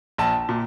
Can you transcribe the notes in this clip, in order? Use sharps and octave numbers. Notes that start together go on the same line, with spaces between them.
A#1 A5
A#2